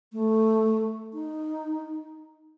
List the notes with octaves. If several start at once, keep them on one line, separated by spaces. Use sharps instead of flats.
A3
D#4